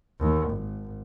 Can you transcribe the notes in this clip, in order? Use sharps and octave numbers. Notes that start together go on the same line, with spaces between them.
D#2
G#1